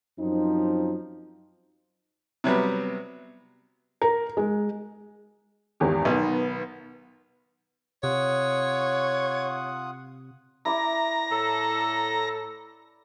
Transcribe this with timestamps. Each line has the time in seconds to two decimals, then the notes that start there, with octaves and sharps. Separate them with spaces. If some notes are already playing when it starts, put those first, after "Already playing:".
0.19 F#2 F3 C4 D#4
2.44 C3 F#3 G3 B3
4.02 A#4
4.37 G#3
5.80 G#1 E2 G4
6.05 B1 D#3 B3
8.03 C3 F4 C#5 F#5 D#6
10.65 E4 D5 A#5
11.32 A2 A4